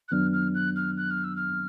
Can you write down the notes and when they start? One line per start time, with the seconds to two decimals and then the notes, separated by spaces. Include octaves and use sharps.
0.08 F#6
0.11 F#2 D#3 F#3 B3 D4 F6
0.33 F6
0.54 F#6
0.76 F6
0.97 F#6
1.10 F6
1.24 E6
1.36 F6